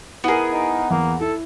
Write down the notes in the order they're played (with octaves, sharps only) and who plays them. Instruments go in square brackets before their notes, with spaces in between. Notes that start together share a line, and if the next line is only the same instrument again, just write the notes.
[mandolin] B3 G#4 [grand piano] E4 A#4
[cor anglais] D#4
[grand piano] E2 [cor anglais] A#3
[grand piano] E4 [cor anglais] A4